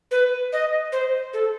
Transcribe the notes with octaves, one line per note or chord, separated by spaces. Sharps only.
B4
D#5
C5
A4